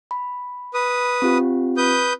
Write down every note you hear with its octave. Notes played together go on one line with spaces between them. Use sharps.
B5
B4 D#6
C4 F4 G4
B4 D#6 G6